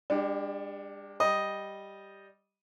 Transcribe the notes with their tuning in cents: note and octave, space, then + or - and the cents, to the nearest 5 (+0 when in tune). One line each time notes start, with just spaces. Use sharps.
G#3 -45 D4 +10 G4 -10
G3 +0 D#5 +0